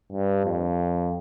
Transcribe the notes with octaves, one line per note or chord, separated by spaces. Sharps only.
G2
F2